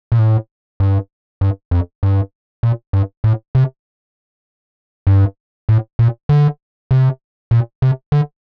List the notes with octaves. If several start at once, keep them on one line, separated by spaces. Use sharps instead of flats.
A#2
A2
G2
G2
F2
G2
A#2
G2
A2
C3
G2
A2
A#2
D3
C3
A#2
C3
D3